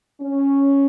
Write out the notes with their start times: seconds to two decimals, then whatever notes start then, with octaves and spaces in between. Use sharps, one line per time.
0.22 C#4